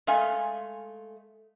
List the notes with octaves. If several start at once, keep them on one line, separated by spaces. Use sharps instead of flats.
G#3 A3 F5 G#5